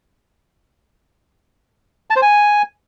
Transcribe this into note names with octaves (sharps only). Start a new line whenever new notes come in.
A5
C5
G#5